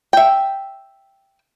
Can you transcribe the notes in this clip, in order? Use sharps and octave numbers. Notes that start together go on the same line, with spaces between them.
E5 G5